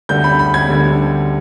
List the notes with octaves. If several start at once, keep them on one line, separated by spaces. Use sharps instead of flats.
D2 D3 G3 G6
B5
B5
G#6
D2 D3 G3